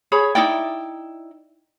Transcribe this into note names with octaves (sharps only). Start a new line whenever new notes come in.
G#4 C#5 B5
D#4 E4 D5 G5